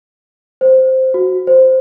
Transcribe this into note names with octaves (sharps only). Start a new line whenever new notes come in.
C5
F#4
C5